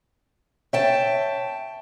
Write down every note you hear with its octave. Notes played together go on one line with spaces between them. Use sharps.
C#5 E5 G5 A5